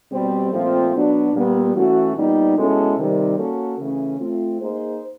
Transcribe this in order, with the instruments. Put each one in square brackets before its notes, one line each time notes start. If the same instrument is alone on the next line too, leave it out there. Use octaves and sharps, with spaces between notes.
[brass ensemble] B2 G3 C4
A#2 F3 A3 C4 F4
B2 F#3 B3 D4
A#2 G3 B3
E3 A3 C#4 F#4
A#2 G3 B3 D#4
B2 G#3 C#4 E4 A4
C3 D#3 G3
A#3 C#4 F#4 A4
C#3 E3 A3 C#4
A3 C4 F4
A#3 D#4 G#4 C5